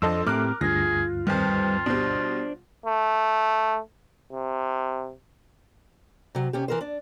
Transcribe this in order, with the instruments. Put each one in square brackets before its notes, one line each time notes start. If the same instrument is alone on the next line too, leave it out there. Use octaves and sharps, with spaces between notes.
[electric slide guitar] F2 D#5 [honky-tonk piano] F3 D4 [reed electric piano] A4 C6 E6
[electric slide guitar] A2 C4 G4 [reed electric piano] A3 [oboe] A#4 [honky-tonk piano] D6 F6 F#6
[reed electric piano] D2 G2 [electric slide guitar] F4 [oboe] G#4 [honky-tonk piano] A#6
[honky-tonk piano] F2 D#3 [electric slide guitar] G3 B4 C5 [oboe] F4
[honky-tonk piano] B2 G3 [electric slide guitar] D4 C5
[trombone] A3
C3
[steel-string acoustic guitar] C3 F#3
C3 C#4 G4
E3 A#4 C5
D4